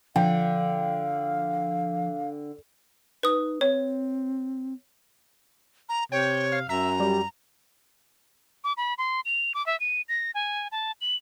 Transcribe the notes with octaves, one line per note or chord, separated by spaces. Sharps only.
D3 F3 F5 G5
D#4 B4 D#6
C4 C#5
A#5
C3 C#5 G5
F5
F#2 E5 A#5
G3
D6
B5
C6
F7
D6
E5
D#7
A#6
G#5
A5
F#7